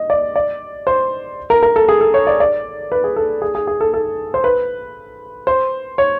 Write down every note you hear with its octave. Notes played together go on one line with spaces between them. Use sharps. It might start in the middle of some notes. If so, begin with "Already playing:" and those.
Already playing: D#5
D5
D5
C5
A#4
A#4
A4
G#4
A4
C#5
D5
D5
B4
G#4
A4
G#4
G#4
G#4
A4
A4
C5
B4
C5
C#5